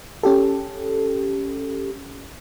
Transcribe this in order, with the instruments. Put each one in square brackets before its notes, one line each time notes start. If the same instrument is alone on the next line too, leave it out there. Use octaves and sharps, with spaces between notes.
[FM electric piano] C#4 G4 A4